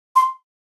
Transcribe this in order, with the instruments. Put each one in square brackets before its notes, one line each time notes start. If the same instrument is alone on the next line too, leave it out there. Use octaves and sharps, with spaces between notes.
[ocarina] C6